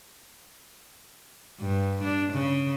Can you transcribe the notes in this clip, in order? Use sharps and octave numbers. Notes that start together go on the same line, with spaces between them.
G2
D4
C#3